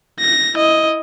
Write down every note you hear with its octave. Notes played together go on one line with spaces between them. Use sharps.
A#6
E4 D#5